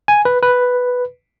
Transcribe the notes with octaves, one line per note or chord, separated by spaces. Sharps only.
G#5
B4
B4